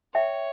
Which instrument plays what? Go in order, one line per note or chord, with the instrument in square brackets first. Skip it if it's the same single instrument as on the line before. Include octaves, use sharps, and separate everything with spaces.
[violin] C#5 [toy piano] E5 G5